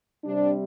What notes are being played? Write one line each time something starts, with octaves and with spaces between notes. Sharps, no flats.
C3 G3 D4